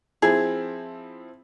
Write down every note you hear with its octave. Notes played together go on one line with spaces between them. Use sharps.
F3 C4 E4 G#4